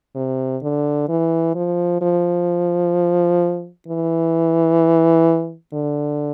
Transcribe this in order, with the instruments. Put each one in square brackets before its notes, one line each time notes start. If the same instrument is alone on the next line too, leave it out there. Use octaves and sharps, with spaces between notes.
[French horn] C3
D3
E3
F3
F3
E3
D3